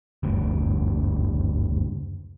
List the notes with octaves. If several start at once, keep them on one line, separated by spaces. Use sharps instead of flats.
F#1 D2 G2